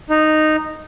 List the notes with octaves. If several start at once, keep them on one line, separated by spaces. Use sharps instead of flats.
D#4